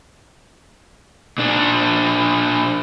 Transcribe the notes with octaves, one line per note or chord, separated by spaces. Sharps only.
A#2 D4